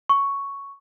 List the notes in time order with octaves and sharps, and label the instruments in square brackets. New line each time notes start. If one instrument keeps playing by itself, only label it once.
[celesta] C#6